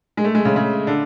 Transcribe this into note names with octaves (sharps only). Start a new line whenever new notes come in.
G#3
A3
G#3
C#3
C#3
D3